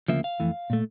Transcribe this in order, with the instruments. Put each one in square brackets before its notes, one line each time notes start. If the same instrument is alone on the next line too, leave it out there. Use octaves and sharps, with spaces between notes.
[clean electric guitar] D2 C#3 F3 A#3 E5
F5
F2 E3 A3
A#2 A3